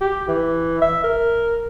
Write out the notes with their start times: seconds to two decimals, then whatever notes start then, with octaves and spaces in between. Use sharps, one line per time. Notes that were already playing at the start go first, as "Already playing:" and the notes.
0.01 G4
0.28 E3
0.82 E5
1.04 A#4